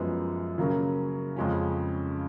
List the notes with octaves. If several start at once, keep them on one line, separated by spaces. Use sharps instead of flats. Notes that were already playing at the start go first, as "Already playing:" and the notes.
Already playing: F#2 F3 G#3 B3
C#3 F#3 A#3 C#4
F2 C#3 G#3 C#4